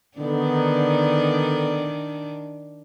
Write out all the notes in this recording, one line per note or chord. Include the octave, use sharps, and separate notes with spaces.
D3 D#3 B3 D4 D#4